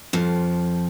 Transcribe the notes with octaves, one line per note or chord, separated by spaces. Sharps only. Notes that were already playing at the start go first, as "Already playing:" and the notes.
F2 F3